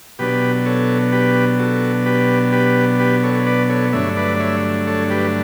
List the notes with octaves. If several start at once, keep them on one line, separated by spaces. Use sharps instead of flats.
B2 F#3 B3 D4 G4 B4
A4 C#5
G4 B4
F#4 A4
G4 B4
G4 B4
G4 B4
A4 C#5
C#5
B4 D5
A4 C#5
G2 D3 F#3 A3 D4 C#5 E5
B4 D5
D5
C#5 E5
A4 C#5
G4 B4